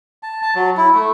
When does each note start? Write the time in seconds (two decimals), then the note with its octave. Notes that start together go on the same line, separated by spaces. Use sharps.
0.23 A5
0.42 A5
0.56 F#3
0.77 E4
0.95 A3